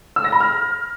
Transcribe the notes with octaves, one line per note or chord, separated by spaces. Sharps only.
E6
A#6
B5
F6